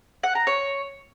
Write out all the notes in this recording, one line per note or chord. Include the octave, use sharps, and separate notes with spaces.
F#5
A#5
C#5